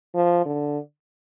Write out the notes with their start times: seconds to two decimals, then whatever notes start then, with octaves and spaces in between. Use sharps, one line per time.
0.15 F3
0.46 D3